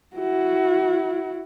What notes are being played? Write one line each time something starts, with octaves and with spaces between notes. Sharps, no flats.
E4 F#4